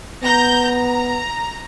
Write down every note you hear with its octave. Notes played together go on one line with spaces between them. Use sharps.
B3 A#5 G6 A#6
A#5